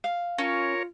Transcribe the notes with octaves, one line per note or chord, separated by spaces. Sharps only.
F5
C#4 F4 A#4 C#5